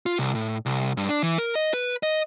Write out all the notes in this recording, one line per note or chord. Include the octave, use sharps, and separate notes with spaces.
F4
C2
A2
C2
G2
D4
E3
A#4
D#5
B4
D#5